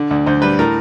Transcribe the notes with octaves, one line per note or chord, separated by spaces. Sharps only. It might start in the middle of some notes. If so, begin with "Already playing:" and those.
Already playing: D3
D2
D2 C5
G3 B4
A2 A#4